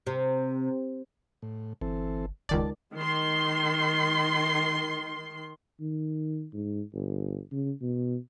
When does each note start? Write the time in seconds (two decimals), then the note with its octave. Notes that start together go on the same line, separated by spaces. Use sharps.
0.07 C3
1.42 A2
1.81 G1 E3 C4 A4
2.49 D#1 C#2 D#3 D5 A5
2.96 D#3 C6
5.81 D#3
6.53 G#2
6.93 G1
7.52 C#3
7.82 B2